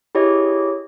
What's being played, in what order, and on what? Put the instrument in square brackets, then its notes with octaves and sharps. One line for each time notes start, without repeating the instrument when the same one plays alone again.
[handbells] E4 G4 G#4 C#5 D#5